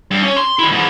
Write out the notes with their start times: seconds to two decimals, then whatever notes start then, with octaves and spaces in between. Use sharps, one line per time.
0.11 G2
0.22 C#4 C#5
0.37 C6
0.59 D#3 E4
0.72 G#2 E3